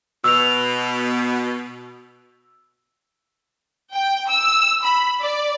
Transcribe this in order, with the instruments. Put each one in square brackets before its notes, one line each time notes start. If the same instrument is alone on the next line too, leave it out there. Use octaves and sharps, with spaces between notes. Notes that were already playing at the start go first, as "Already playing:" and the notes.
[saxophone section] B2 [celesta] E6 F7
[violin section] G5
E6
B5
D5